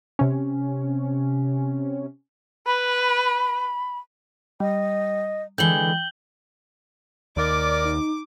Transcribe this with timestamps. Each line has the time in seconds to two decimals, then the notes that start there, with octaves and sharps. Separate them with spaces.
0.19 C3 C#4
2.67 B4 B5
4.60 G3 D#5
5.58 D3 E3 G#3 G5 G6 F#7 G7
7.37 D#2 A#4 D5 D6
7.84 D#4